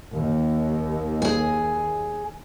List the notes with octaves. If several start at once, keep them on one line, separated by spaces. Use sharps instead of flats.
D#2
G#4 G#5